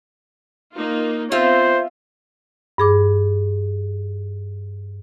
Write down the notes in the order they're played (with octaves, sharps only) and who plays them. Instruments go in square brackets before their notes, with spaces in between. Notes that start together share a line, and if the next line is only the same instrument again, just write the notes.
[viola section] A#3 D#4 F4
[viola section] B3 C4 [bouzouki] F4 E5 [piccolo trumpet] C5
[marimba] G2 G#4 D6